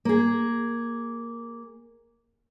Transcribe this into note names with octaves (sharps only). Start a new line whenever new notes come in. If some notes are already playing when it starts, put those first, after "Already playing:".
A#3 G#4